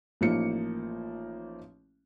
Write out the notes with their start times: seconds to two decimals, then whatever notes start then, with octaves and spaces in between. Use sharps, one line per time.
0.21 A1 F3 A#3 D#4 C#7